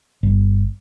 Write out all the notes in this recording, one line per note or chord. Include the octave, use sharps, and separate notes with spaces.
G1